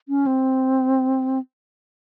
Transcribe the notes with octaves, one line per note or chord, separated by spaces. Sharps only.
C#4
C4